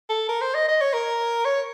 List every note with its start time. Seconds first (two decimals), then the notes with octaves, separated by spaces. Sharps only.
0.10 A4
0.29 A#4
0.41 C5
0.54 D#5
0.68 D#5
0.81 C#5
0.94 A#4
1.45 C#5